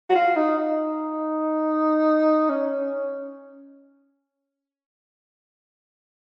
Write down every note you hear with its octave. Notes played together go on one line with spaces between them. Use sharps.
F#4
F4
D#4
D#4
C#4